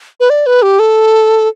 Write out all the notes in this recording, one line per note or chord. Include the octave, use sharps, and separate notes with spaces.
B4
D5
B4
G4
A4